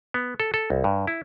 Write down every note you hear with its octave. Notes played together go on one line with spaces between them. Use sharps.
B3
A4
A4
C2
G2
E4